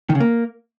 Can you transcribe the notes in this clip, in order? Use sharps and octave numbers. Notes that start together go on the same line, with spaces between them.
D#3
C#3
A#3